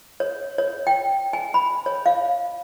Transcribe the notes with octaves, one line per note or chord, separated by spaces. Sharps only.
C#5
C#5
G5
G#5
B5
C#5
F5